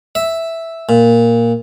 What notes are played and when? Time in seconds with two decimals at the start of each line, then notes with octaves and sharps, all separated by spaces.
0.15 E5
0.89 A#2